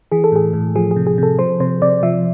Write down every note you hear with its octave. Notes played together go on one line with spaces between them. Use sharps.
E3 G#4
A4
A2 G#4
A2
F3 G#4
G#4
C3
G#4
C3 A4
F3 C5
C3 C5
C3 D5
F3 E5